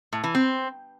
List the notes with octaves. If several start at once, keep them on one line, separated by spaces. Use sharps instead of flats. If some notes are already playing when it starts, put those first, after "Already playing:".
A2
E3
C4